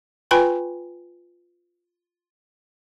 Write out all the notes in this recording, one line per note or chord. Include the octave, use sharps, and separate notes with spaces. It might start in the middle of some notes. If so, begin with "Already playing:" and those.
F4 B4 G5 G#5 B5 C6